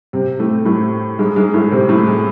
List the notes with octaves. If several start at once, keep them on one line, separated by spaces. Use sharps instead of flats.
C3 C4
A2 A3
A2 A3
G#2 G#3
G#2 G#3
A2 A3
C3 C4
A2 A3
G#3